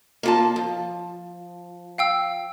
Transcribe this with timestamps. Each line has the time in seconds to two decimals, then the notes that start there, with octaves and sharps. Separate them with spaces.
0.23 A#3 F4 A5
0.56 F3
1.98 F5 G5 E6